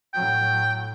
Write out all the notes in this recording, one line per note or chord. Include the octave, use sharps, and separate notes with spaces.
A2 F#3 G5